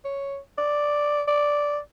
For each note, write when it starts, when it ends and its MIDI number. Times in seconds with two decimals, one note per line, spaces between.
0.05 0.37 73
0.58 1.23 74
1.28 1.78 74